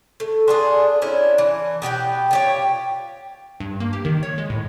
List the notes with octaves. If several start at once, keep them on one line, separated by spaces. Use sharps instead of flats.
A3
D4 F4 G#4
C#4 D4 E4
E3
B2 G4 B4 G5
F4 G4 C#5
G2
A#3
G4
D#3
C#5
G#3
A2